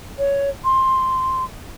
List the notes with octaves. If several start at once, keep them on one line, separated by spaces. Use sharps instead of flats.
C#5
C6